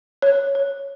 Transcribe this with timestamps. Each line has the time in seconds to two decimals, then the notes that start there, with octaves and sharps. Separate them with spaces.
0.22 C#5
0.55 C#5